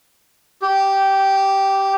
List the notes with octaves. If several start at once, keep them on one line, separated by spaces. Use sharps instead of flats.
G4